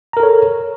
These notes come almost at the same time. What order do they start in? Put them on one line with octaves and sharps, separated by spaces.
A#5 A#4 A4 C#5